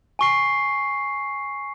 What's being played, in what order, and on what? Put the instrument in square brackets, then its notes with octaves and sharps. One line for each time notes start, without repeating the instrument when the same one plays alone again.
[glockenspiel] G#5 C#6 C7